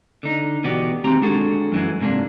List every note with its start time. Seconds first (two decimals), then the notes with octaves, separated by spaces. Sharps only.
0.23 D3 D#4
0.64 E2 B2 B3 F#4 G4 D5
1.04 D#2 C4 G4 A#5
1.22 G#3 D4 F#4 G#4 A4
1.72 F#2 E3 G#3
2.01 G#2 C3 A#3 C4 D4